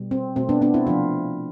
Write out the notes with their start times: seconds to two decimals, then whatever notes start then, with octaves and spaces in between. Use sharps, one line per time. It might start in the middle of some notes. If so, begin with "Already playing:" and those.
Already playing: B2 G3
0.11 C4
0.36 B2 A3 C4
0.49 B3 D4
0.62 B3 D4
0.74 C4 E4
0.87 C3 F3 A3 D4 F4